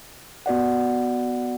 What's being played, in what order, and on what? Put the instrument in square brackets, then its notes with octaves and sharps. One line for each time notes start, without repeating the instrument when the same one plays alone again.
[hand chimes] B3 F#4 D5 F#5